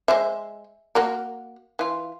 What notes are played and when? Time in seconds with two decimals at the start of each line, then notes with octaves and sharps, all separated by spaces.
0.08 G#3 C5 E5
0.95 A#3 F#4 A#4
1.79 E3 F4